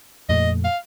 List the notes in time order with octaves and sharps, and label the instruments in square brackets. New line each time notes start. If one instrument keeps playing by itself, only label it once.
[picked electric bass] F2 A#2 A3 [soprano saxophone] D#5
[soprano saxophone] F5